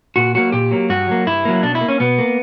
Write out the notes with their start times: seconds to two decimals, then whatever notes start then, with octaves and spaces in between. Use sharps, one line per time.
0.16 A#2 F#4
0.34 F#3 A#3 F#4
0.52 A#2 G4
0.71 F#3 A#3
0.90 G2 F#4
1.08 F#3 A#3
1.27 G2 E4
1.45 F#3 A#3
1.63 B2 D4
1.75 E4
1.81 A#3
1.88 C#4
2.00 B2 B3
2.18 A#3